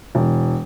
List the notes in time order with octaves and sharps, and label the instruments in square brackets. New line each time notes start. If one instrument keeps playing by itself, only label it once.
[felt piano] E1